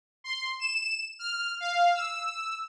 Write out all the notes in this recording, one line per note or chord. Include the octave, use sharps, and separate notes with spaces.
C6
E7
F6
F5
E6